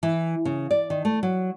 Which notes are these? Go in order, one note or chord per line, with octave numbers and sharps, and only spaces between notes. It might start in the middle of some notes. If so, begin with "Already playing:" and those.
E3
C#3
D5
D#3
A3
F#3